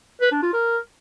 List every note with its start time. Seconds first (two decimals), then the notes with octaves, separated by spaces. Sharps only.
0.21 B4
0.32 D4
0.43 F4
0.53 A#4